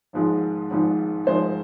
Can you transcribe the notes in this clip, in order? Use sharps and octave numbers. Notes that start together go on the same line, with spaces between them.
G#1 G#2 F3 G#3
G#1 G#2 F3 G#3
G#1 G#2 F3 G#3 C5